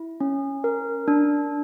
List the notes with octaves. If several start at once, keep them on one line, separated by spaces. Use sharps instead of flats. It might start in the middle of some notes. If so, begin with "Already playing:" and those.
Already playing: E4
C#4
A#4
D4